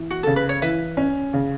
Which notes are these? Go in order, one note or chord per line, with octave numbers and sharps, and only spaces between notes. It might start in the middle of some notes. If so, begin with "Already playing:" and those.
Already playing: E3
F#4
C#3 A4
B4
C#5
E3 B4 E5
C#4
C#3